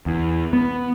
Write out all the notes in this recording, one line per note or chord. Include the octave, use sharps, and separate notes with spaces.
E2
B3